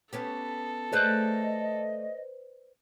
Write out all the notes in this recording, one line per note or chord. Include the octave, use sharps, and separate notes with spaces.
B3 C#4 G4 A4
A3 G#4 B4 C5 D5 D#5